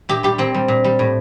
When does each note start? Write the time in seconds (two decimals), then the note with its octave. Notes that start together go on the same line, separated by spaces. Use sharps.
0.09 A#2 G4
0.23 G3 G4
0.38 A#2 C4
0.54 G3
0.68 A#2
0.84 G3
0.99 A2